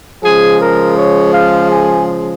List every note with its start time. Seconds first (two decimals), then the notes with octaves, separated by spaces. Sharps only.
0.24 C#3 F3 G#3 G#4
0.61 A#4
0.97 C#5
1.34 F5
1.71 G#5